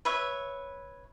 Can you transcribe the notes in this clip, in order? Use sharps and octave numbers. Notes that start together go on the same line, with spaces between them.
B4 C#5 E5